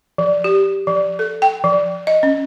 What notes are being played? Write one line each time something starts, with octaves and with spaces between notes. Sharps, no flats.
F3
G4
F3
A4
G5
F3
D#5
C#4